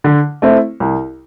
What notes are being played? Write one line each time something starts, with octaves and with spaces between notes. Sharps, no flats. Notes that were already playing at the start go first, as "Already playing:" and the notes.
D3
A3 C4 E4
C2